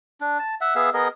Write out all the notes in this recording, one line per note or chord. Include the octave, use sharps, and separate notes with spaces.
D4
A5
E5 F#5
B3 G#4 E5 F5
B3 G#4 A#4 D#5